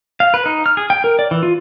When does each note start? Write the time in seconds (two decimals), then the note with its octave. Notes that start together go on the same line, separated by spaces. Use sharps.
0.20 F5
0.34 B4
0.46 D#4
0.66 F6
0.77 G#4
0.90 G5
1.04 A#4
1.19 D5
1.31 E3
1.43 F4